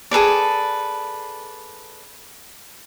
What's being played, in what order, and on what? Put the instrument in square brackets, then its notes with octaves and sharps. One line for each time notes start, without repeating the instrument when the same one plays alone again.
[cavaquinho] G#4 A4 B4 D5